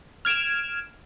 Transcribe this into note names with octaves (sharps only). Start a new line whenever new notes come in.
F6 G#6 D7 E7